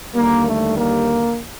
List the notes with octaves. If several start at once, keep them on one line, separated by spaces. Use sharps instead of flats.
D#2 D3 G3 A#3
A3
A#3